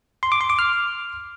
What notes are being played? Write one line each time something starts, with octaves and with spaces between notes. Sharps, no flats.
C6
D6
C6
D6
F6